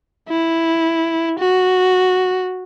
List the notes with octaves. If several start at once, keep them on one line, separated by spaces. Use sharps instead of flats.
E4
F#4